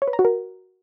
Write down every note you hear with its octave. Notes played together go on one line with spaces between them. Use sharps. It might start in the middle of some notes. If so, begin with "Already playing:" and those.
C#5
B4
A#5
F#4
A#4